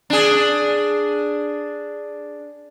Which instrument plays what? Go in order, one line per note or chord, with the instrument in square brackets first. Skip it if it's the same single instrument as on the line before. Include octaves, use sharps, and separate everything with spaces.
[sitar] D4 G#4